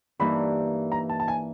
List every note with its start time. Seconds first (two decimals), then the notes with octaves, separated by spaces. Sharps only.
0.19 G2 E3 G3 A#3 D#4 B5
0.92 A#5
1.10 A5
1.20 A5
1.28 G#5